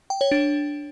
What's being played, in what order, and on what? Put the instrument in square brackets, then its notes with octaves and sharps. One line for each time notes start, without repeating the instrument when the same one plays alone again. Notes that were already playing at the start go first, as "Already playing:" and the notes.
[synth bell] G5
C#5
D4